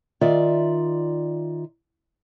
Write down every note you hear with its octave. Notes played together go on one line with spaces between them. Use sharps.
D#3 F4 D5 E5